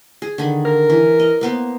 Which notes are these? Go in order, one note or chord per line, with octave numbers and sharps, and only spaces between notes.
G#4
D3 D#3 B5
A#4
E3
D#5
A#3 B3 C5